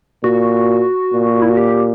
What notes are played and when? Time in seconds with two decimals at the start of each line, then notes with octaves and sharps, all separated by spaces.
0.24 A#2 F#4
1.13 A#2
1.42 E4
1.50 F#4
1.57 G4